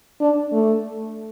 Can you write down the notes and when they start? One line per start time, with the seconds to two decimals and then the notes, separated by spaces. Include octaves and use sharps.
0.21 D4
0.52 A3